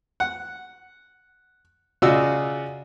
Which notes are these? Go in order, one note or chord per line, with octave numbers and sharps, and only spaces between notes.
F#5
C#3 F4 F#4 D5 D#5 E6